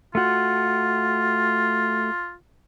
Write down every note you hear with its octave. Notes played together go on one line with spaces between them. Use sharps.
A3 F4 F#4